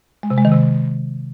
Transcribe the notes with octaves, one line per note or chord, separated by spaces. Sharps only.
G#3
C3
G#3
D#3
C3